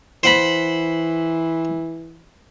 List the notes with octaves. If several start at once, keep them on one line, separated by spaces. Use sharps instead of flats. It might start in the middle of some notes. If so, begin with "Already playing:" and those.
E3 C5 F#5 B5